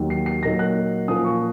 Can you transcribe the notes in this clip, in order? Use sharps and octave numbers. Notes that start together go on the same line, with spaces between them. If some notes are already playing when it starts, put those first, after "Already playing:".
Already playing: D#2 D#3 F#3
C7
C7
A#2 F#3 A#3 D#4 A#6
F#6
A#2 F3 A#3 C#4 D#6
C#6